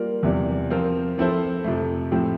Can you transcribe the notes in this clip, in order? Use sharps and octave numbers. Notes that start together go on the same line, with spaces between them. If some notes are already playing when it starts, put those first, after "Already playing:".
Already playing: G3 A#3 F4 A#4
E2 C3 G3
F3 C4 F4 A#4
F3 C4 E4 A4 C5
F2 C3 F3 A3
A2 F3 C4 G4